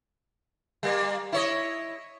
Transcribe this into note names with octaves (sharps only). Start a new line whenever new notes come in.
G3 A#3
E4 C#5 D#5